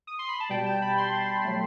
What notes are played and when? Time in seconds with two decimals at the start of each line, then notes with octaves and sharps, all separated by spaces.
0.07 D#6
0.19 C6
0.29 B5
0.40 A5
0.49 B2 G3 G5
0.66 A5
0.82 B5
0.98 C6
1.44 F#3 A3